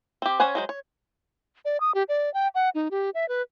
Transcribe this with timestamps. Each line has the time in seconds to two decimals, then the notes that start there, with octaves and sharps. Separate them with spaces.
0.22 C4 G4
0.40 C#4 C5 C#5 F#5 G#5
0.55 F#3 G#3 C5
0.69 C#5
1.65 D5
1.80 D#6
1.95 G4
2.09 D5
2.34 G5
2.55 F#5
2.75 D#4
2.91 G4
3.14 E5
3.29 B4